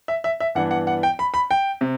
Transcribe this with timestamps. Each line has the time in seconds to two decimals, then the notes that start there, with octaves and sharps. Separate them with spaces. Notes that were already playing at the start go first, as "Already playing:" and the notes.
0.08 E5
0.24 E5
0.40 E5
0.55 G2 E3 B3 D4 F#5
0.71 F#5
0.87 F#5
1.03 G5
1.19 B5
1.34 B5
1.51 G5
1.81 C3